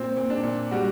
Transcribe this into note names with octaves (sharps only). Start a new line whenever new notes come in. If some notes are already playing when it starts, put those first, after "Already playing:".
Already playing: A#2 C4
A#2
D4
A#2
G3 F#4